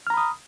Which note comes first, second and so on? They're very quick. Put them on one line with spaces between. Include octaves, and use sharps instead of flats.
F6 A#5 B5 D#6